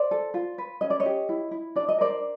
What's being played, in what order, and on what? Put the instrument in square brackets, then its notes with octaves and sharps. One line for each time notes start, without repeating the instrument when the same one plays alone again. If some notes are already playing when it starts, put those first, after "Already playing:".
Already playing: [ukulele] C5 D5
A4
F4
B4
C#4 D#5
D5
C#5 D#5
G4
E4
E4
D4 D5
D#5
A#4 C5 D5